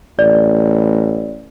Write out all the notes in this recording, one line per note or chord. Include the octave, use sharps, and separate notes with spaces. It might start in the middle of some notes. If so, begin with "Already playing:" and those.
A1 D5